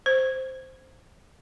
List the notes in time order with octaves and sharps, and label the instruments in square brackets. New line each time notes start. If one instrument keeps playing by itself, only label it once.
[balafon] C5